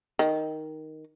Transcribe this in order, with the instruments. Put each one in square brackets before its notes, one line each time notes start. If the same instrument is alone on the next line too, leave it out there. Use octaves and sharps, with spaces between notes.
[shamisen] D#3